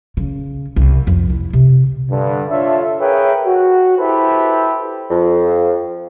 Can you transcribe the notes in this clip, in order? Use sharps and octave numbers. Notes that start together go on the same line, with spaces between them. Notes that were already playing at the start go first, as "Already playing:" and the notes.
C#3
C2
F2
E4
C3
G2 D3
D4 F4 A4 C#5 E5
G#4 A#4 B4 C#5 E5 G5
F#4
E4 G4 A4 B4 C5 E5
F2 F3